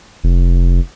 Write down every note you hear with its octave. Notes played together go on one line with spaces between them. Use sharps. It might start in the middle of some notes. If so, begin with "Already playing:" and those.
F1